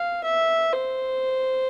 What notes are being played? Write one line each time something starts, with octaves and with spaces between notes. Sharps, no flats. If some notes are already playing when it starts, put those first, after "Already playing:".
Already playing: F5
E5
C5